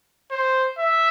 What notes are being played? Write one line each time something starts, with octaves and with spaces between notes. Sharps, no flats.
C5
E5